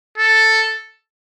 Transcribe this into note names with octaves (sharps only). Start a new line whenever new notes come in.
A4